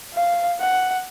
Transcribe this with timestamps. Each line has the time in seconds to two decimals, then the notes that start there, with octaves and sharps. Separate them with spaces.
0.14 F5
0.60 F#5